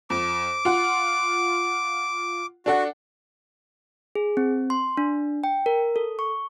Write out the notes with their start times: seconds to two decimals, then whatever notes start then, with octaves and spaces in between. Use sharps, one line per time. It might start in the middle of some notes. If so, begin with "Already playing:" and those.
0.10 F2 D6
0.65 F4 F#5
2.66 D4 F#4 A4 F#5
4.15 G#4
4.37 C4
4.70 C6
4.97 D4
5.44 G5
5.66 A#4
5.96 A4
6.19 C#6